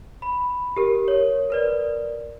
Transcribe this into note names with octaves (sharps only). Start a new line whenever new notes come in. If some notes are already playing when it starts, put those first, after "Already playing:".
B5
G4 A#4
A#4 C#5
A#4 B4 D5